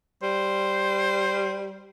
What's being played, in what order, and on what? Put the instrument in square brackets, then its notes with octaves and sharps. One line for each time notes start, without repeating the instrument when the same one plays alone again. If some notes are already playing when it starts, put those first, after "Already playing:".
[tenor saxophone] G3 [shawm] C5